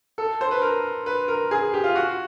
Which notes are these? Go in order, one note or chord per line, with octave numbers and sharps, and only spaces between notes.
A4
C5
B4
A#4
B4
A#4
G#4
G4
F4
F#4